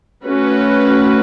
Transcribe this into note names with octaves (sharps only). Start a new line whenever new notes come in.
A3 C#4 F#4 B4